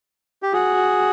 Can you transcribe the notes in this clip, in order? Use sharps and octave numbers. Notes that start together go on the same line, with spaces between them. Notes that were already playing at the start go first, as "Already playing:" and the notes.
G4
F#4 G#4